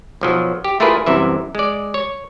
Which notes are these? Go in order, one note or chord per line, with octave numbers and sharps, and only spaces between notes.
B1 F3 F#3
G4
A3 E4 F4 G#4 A#4 B4
C2 F#2 C3 E3 E5
G#3 D5
C#5